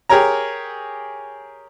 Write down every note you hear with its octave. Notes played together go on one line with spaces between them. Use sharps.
G4 G#4 A#4 C#5 A#5